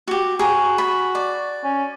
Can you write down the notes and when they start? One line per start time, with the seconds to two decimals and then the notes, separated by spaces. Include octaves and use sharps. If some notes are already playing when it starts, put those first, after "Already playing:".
0.08 F#4 G4
0.39 F#4 G#4 A#5
0.78 B5
1.15 D5
1.64 C#4